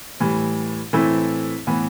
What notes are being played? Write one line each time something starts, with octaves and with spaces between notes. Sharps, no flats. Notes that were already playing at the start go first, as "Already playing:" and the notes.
A2 E3 G3
A2 E3 A3 C4 E4
A2 E3 B3